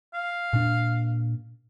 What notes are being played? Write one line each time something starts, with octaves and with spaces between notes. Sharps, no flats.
F5
A#2 D4